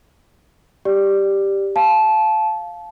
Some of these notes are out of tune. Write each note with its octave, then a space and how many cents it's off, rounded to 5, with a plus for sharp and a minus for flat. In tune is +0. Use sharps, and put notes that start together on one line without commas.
G4 +0 D5 +5
F5 +0 A5 -20